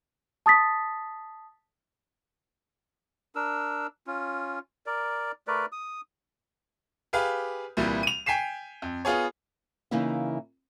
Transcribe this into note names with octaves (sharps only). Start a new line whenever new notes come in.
A5 D#6 A6 B6
D4 A#4 E6
C#4 F4
A#4 D5
A3 A#4 B4 D5
D#6
G4 G#4 B4 F5
C2 A#2 E3 G3
D#7 F7
G5 G#5 B6 C7 E7
F2
B3 F4 G#4 C#5
C#3 E3 A#3 D#4 E4 E5